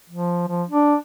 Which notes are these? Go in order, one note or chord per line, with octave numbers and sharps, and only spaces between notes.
F3
F3
D4